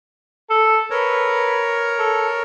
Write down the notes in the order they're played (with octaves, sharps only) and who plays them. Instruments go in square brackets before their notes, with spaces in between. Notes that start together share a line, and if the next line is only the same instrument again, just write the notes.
[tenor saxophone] A4
[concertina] A#4 C#5 [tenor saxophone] B4
[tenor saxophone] A4